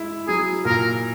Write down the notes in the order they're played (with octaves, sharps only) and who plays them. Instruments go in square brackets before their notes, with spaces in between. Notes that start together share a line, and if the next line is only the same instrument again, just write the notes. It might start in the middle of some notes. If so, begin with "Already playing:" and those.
Already playing: [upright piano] G#3 E4
[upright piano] F#3 [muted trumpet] G#4
[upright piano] A#2 [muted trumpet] A#4